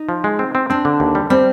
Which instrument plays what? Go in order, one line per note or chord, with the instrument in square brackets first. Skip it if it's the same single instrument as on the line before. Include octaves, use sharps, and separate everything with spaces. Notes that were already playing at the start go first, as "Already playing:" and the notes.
Already playing: [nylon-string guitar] D#4
[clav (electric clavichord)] F3
G#3
C4
C4
[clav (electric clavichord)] C4 [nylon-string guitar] D4
[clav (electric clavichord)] D3
D#2
G3
[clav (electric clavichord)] G3 [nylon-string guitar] C4